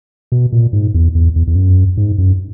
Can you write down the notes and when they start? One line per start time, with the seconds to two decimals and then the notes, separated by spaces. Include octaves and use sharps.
0.32 B2
0.52 A#2
0.73 G#2
0.94 E2
1.15 E2
1.36 E2
1.47 E2
1.55 F#2
1.97 G#2
2.18 F#2